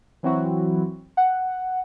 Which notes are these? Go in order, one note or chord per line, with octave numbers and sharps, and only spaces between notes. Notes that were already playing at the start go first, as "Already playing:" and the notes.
E3 F#3 C4 E4 F#4
F#5